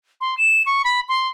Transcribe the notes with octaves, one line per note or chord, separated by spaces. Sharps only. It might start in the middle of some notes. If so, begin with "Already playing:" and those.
C6
E7
C#6
B5
C6